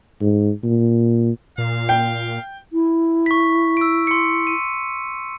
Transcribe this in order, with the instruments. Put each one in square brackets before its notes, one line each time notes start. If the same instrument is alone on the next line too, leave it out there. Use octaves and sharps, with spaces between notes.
[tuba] G#2
A#2
[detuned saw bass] A#2 [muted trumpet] F5
[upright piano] G5
[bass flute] E4
[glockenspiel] C#6 B6
E6 D7
C6 C#7
D#7